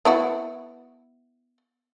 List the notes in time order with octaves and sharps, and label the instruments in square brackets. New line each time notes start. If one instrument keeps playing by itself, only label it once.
[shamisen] B3 E4 F#4